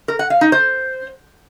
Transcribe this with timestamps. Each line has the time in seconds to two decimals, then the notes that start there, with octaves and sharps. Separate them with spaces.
0.08 A#4
0.19 F#5
0.30 F5
0.41 D#4
0.52 C5